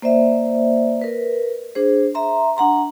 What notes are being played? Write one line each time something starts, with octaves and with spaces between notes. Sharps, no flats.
A#3 C5 D5 E5
A#4 B4
D4 G#4 C5
E5 A#5 C6
D4 F#5 A#5 C6